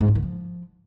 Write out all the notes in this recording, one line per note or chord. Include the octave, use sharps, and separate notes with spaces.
G#2
G2
D#3
F3